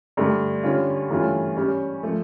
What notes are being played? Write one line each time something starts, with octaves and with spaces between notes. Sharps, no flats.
G2 D3 A3 D4
D3 G3 C#4 F4
G2 E3 A3 C#4 F4
G3 C#4 G4 C#5
F3 A3